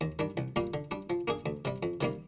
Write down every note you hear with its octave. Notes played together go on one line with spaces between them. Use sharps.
D#2
D#3 G3 D4
C2
A#2 G3 A#3
D3
G3 D4
F3
A#3 D4 G#4
D2
C3 G3
F2
C3 D#3 G3 A#3